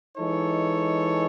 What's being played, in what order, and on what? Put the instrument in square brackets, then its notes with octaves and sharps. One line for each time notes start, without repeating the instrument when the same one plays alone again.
[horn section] E3 G#3 D#4 A4 C#5